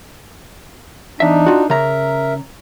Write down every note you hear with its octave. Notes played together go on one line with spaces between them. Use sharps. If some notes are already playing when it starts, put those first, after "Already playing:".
E2 D4 D#4 E5
F4 F#4
C#3 A#4 E5 A#5